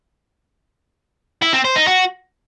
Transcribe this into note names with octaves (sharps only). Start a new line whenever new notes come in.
E4
C4
C5
D#4
F#4